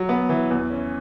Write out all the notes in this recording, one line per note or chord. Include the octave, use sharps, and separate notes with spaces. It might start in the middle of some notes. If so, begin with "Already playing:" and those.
Already playing: F#3
B3
E3
E2
C#4